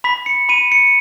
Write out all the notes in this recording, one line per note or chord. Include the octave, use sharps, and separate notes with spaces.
B5 B6
C#7
B5 D#7
C#7